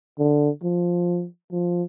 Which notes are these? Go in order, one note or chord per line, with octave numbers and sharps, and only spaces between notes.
D3
F3
F3